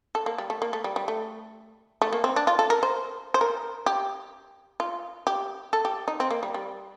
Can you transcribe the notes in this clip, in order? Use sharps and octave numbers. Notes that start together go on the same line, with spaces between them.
A4
A#3
G3
A3
A#3
A3
G3
G3
A3
A3
A#3
C4
D4
F4
A4
A#4
C5
C5
A#4
G4
F4
G4
A4
G4
D#4
C4
A#3
G3
G3